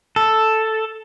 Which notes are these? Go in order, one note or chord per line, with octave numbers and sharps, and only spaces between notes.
A4